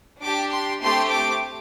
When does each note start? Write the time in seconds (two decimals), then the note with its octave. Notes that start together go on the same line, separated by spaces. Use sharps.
0.22 D4 G4 D6
0.51 C6
0.81 A3 C4 G4 C6
1.10 D6